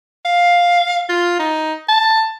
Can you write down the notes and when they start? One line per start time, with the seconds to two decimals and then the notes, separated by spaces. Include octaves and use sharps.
0.25 F5
1.09 F4
1.39 D#4
1.89 A5